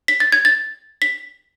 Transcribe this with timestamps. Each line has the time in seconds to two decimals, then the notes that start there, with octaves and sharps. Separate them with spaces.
0.08 B6
0.20 A6
0.32 G#6
0.45 A6
1.02 B6